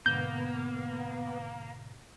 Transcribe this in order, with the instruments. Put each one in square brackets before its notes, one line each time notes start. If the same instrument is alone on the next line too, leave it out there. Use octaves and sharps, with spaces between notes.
[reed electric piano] G#2 B2 D3 [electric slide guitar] A#3 [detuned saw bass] B3 [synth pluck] G6